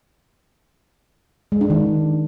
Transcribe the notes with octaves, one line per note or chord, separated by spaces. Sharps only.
G#3
D4
D#3